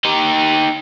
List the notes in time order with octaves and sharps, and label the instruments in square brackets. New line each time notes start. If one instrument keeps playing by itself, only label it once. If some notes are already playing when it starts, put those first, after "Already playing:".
[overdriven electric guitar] D#4 G4